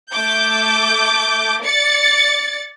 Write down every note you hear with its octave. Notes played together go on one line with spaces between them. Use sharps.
A3 D6 G6
D5 A6 C#7